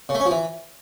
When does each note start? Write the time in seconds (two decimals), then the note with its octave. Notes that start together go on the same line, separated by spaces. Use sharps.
0.09 C#3
0.15 A3
0.20 C#4
0.26 F3
0.31 E3